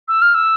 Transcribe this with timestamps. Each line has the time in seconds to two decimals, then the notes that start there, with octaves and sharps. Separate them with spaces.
0.08 E6
0.21 F6
0.34 E6